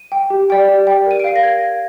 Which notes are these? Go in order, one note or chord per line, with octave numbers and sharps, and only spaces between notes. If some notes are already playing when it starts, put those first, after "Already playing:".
Already playing: D#7
G5
G4
D5 G5
G4
D5 G5
A#4 D#7
D7
F5 C7
A#6
A#4 G#6
F5